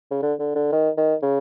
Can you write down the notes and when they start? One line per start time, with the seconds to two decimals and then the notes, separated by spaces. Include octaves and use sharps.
0.11 C#3
0.22 D3
0.39 D3
0.55 D3
0.72 D#3
0.97 D#3
1.22 C#3